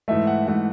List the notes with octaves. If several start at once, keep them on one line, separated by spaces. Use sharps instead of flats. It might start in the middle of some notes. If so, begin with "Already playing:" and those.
G#2 E3 A3 E5
F#5
G#2 E3 A3 F#5